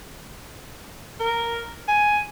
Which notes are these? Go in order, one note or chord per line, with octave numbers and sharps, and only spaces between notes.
A#4
G#5